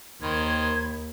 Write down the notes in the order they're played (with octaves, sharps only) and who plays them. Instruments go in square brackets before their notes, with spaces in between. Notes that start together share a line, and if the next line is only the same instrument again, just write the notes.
[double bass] D#2 [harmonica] D#3 C5 [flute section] B5 G#6